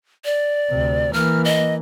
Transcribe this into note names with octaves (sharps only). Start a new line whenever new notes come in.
D5
D2 C3
E3 A#3 F6
D#5